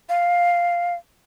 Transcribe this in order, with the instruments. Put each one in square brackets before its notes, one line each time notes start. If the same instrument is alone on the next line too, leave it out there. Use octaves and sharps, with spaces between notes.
[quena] F5